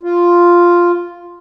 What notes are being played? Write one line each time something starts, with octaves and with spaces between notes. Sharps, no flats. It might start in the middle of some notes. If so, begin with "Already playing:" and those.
F4